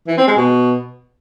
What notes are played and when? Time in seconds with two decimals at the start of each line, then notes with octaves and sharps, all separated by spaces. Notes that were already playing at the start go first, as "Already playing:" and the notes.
0.08 E3
0.18 C4
0.27 G#3
0.37 B2